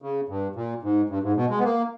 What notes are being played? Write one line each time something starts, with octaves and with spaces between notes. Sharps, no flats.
C#3
G2
A#2
G#2
G2
G#2
B2
G#3
B3
A#3